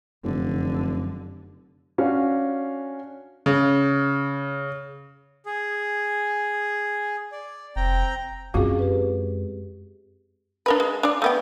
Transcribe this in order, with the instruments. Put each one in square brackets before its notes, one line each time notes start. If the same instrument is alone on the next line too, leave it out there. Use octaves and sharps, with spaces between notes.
[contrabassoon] F1 [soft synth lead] F#2 [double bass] D3
[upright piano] C#4 D4 F#4 F5
[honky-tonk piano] C#3
[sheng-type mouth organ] G#4
D5
[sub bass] F1 [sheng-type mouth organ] C4 G5 A#5
[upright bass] F#2 G#3 [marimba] C4 G#4 [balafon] F4 F#4 F5
[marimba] G4 B4
[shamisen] D4 A#4 B4
G#3
D4 D5
A3 B3 G5